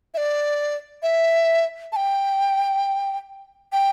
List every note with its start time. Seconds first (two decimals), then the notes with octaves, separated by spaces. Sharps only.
0.14 E5
0.17 D5
1.03 E5
1.92 A5
1.96 G5
3.72 G5